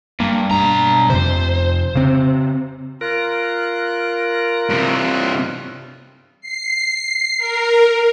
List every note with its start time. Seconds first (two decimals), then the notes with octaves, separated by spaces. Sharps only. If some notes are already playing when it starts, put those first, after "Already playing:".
0.20 G2 A#3
0.51 G2 B2 A#5
1.10 F2 C3 C5
1.95 C#3 C4
3.01 F4 A#4 F#6
4.69 G2 C3
6.41 C7
7.38 A#4